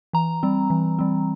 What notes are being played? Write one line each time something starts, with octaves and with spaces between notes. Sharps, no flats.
E3 A#5
G3 C4
E3
G3 C4